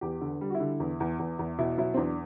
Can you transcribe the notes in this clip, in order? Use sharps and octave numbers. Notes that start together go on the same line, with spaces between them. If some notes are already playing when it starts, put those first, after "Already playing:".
E2 G4
D3
G3
F#4
E4
D3
E2
E2
E2
E2
B2 E4
F#3 E4
C4
E2 D4